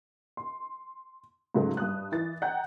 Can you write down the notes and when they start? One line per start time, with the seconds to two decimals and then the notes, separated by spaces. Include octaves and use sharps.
0.37 C6
1.54 G#2 C#3 F#3 G#3 A3
1.77 G2 D#6 F#6
2.12 E3 A6
2.42 F#5 G5 A#5 F#6 G6